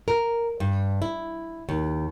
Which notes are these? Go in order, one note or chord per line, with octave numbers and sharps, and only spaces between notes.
A#4
G2
E4
D#2